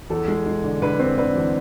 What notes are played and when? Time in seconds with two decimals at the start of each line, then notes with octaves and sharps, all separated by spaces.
0.10 E2 A4
0.28 G#3
0.46 G#3
0.64 D3
0.82 D3 B4
0.99 C4
1.17 D3 B4
1.35 E2